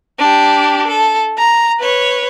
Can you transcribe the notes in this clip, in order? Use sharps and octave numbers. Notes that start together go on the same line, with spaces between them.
D4 G4
A4
A#5
B4 C#5